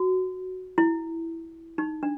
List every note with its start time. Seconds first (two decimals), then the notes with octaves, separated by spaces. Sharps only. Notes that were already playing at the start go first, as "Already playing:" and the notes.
Already playing: F#4
0.78 E4
1.78 D#4
2.03 D4